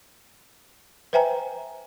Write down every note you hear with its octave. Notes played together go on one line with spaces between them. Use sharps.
B4 C5 E5 G5 G#5 A#5